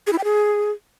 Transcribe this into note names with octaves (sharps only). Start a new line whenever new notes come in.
G#4
E4
G5
G#4